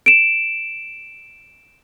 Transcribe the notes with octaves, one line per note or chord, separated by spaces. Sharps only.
D7 E7